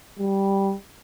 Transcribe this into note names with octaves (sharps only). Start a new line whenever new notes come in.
G3